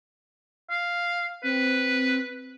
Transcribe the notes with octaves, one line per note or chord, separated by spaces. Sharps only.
F5
C4 B4